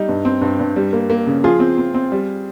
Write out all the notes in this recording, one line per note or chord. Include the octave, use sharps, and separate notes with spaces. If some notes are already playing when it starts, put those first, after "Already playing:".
Already playing: G3 D#4
G2
C4
G2
G2
G3
A#3
A#3
C#3
F3 F4 G#4
C4
C4
C4
G3